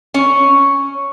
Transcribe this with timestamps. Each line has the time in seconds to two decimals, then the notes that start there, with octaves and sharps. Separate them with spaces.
0.14 C#4 C#5